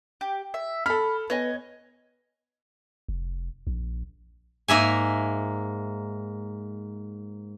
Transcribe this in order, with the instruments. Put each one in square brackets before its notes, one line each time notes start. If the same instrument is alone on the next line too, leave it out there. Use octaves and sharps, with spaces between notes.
[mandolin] G4
E5
[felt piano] A4 F6 [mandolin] B5
[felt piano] B3 [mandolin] C#5 D#5 G#5
[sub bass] F1
A#1
[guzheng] G#2 A#3 E5 G#5